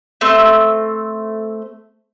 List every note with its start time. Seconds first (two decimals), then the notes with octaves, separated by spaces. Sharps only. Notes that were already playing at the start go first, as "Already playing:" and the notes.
0.21 A3 C4